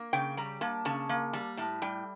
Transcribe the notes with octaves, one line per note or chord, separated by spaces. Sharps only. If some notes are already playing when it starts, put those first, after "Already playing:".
Already playing: A#3
C#3 G5
G3 A#5
A#3 A5
C#3 A5
A#3
G3 A5
A2 A5
G3 G5